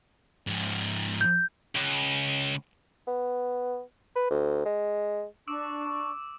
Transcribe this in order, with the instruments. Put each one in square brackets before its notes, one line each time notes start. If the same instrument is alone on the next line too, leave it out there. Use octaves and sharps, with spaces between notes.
[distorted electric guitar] G#2 F3
[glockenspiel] G6
[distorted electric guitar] C#2
[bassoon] B3
B4
D2
G#3
[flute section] D4 C#6 [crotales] D6 E6 D7